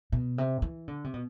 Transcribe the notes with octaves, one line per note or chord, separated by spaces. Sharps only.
B2
C3
E3
D3
C3
B2